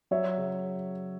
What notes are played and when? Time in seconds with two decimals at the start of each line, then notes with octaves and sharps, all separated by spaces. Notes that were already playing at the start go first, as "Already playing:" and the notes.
0.11 F#3 C#5 E5
0.37 C#3